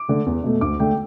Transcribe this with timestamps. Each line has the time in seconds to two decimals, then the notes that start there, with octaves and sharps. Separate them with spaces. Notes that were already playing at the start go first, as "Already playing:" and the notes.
Already playing: D6
0.08 D3 A3
0.26 E2
0.44 B2 A3
0.61 D2 D6
0.80 D3 A3 G5